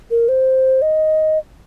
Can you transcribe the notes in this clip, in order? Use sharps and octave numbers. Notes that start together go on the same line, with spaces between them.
A#4
C5
D#5